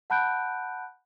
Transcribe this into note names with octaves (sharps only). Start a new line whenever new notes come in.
F#5 A5 B5 F#6 G6 D7